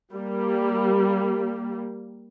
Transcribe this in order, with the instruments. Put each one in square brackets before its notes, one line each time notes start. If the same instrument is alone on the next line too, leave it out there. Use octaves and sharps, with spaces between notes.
[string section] G3 A#3